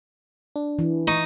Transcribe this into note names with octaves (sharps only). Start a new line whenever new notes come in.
D4
E3
D#4 C#6